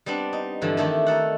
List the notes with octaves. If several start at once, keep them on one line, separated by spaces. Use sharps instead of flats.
G3 B3 C4 D4
D#4
G2 D3 E3 F3
D#3 E3 A3 D4 E4 G4
D#4 A4 F#5